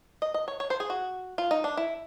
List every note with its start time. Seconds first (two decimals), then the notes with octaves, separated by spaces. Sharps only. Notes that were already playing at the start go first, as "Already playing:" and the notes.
0.22 D#5
0.34 D#5
0.48 C#5
0.60 C#5
0.70 C5
0.80 G#4
0.90 F#4
1.38 F4
1.51 D#4
1.64 D4
1.77 E4